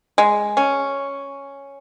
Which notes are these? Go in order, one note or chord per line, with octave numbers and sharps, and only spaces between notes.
G#3
C#4